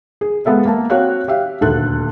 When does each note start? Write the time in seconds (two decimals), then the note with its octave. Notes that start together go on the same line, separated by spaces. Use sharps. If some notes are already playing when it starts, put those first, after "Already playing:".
0.21 G#4
0.45 G#3 B3 A4 E5 F5
0.65 A#3 A5
0.90 C4 F#4 C#5 F5 F#6
1.28 G4 E5 F5
1.61 D#1 D2 A4 F#6